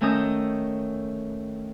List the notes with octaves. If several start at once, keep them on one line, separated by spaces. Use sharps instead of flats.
D#3 A3 C#4 D#5 D#6 G6